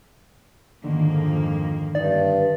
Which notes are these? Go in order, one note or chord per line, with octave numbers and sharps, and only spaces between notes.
F2 G#2 D3 D#3 A#3
G2 D#4 D5